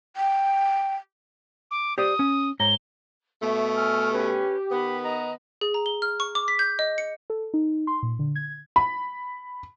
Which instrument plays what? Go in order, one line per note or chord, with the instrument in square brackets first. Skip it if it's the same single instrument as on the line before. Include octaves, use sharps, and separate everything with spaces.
[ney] G5
[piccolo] D6
[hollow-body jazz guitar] G4 C5 D5 [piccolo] D#6
[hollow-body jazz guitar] C#4
[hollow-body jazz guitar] G#2 C#5 A#5 [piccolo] G7
[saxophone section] B2 A3 [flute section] E5
[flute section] G#5 E6 F6
[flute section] C#4 B4 [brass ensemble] G4
[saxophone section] D#3 B3 [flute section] B5
[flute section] D#5 A#5
[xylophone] G#4
A#5
G7
F6
C#6
D6
B6
G6
D#5
C#7
[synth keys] A4
D#4
C6
A#2
D3
G#6
[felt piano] B5